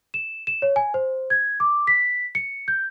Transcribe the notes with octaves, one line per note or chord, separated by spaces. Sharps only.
E7
E7
C#5
G#5
C5
G#6
D6
B6
C#7
G6